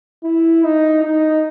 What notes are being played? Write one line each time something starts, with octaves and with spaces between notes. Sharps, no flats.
E4
D#4
D#4